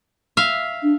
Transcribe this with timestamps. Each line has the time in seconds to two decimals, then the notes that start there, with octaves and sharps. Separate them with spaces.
0.37 E5 F5
0.83 D4